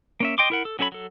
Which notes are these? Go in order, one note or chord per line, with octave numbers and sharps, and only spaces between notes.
A#3 C#4 E5
D#5 G5 C6 D6
E4 A#4 F#5
A4
F#3 C#4 A4 C#5 B5
F#3 A4